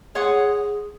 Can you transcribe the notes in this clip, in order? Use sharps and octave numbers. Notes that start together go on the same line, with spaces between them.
G#4 C#5 F#5 C6 D#6